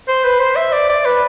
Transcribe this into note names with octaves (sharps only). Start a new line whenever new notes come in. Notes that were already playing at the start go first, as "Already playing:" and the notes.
C5
B4
C5
E5
D5
D5
B4